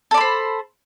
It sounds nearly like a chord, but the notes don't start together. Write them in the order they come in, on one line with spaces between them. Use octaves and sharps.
A4 D5 B5 C5